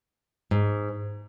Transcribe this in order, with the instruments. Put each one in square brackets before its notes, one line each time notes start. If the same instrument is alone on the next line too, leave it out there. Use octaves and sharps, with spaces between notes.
[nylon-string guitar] G#2